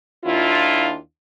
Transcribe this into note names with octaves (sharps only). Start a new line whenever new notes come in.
D#2 D4 E4 F4